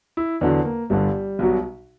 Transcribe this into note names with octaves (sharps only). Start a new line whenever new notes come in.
E4
E2 D3 F#3 D4
A#3
G1 G2 D3 G3
B1 B2 F#3